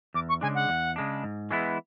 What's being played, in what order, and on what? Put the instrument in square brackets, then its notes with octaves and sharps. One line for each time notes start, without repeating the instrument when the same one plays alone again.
[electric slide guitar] E2 [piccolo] D6
[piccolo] C#6
[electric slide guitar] C#3 G#3 D4 [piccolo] G#5
[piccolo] F#5
[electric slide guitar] E2
C#3 G#3 D4
G#2
E3 G#3 B3 E4